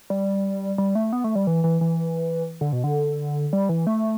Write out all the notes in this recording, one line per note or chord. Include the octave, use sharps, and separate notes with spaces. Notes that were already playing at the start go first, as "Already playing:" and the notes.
G3
G3
A3
B3
A3
G3
E3
E3
E3
D3
B2
D3
G3
E3
A3